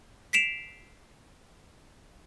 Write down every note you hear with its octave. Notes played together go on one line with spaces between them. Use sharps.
B6 C7 D7 E7 F7